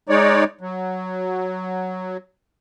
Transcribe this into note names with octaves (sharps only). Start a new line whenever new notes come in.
G#3 D#4 C#5 D5
F#3